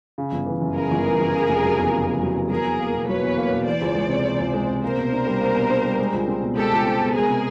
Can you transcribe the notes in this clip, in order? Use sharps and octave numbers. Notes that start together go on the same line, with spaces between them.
C#3
G1
E3
F#2
C#3 G#4 A#4
G1
E3
F#2
C#3
F1
F#3
E2
C#3
F1
F#3
E2
F#3 G#4 A#4
E2
A#3
B2
F#3 B4 C#5
E2
A#3
B2
E3 C5 D5
C#2
G#3
C3
E3
C#2
G#3
C3
A#3 A#4 C5
B2
D4
G3
A#3
B2
D4
G3
G#3
C#2
C4
B2
G#3 G4 A4
C#2
C4
B2
G#3 G#4 A#4
C3